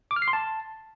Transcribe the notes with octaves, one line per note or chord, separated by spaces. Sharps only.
D6
F6
C7
C6
A5